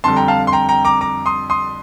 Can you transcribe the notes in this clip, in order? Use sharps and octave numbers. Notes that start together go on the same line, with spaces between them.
F2 D3 G3 A5 C6
G5 A#5
F5 A5
C6
G5 A#5
G5 A#5
A#5 D6
A#5 D6
C6 D#6
C6 D#6